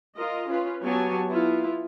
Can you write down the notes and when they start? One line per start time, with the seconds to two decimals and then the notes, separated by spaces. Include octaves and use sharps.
0.16 F4 A#4 D#5
0.48 C#4 F4 B4
0.83 F#3 B3 G4 C#5 G#5 A5
1.28 B3 E4 F4